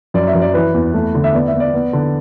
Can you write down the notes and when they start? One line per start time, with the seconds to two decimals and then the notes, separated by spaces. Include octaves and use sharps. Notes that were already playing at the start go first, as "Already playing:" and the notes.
0.14 F#2 D5
0.27 E5
0.35 F#2
0.42 D5
0.54 E3 B4
0.74 E2
0.94 A3
1.15 D3
1.24 E5
1.34 B3 D5
1.48 E5
1.53 B3
1.60 D5
1.73 B3
1.93 D3